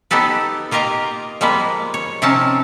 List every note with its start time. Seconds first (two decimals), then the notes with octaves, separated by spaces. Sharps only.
0.11 B3 D#4 G4 A4 B4
0.71 A#3 F4 G4 A#4 D#5 A#5
1.41 F3 G3 G#3 A#3 B3 B4
1.94 C#5
2.22 C3 F3 C4 C#4 D#4 A5